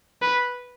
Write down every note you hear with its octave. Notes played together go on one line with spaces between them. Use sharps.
B4